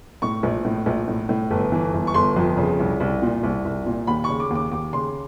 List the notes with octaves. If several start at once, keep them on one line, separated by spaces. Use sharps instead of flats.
A2 C#6
A#1
A2
A#1
A2
A2
G1
E3
G1
C#6
G1 C6
F2
C#3
C2
C2
A#2
C2
C2
A#2
D#2 B5
C#3 C#6
D6
D#2
D6
D#2 D6
C#3 C6